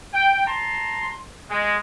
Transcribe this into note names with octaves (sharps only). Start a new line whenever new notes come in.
G5
A5 A#5 C6
G#3